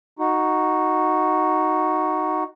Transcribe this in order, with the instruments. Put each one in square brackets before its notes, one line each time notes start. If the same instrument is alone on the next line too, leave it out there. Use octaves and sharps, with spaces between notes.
[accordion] D#4 F#4